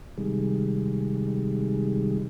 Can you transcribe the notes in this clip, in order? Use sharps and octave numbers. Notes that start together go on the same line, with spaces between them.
C3 D#3 G3 G#3